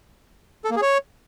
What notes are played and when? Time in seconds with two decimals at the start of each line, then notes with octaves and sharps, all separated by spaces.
0.65 A4
0.70 A#3
0.76 G#4
0.82 C#5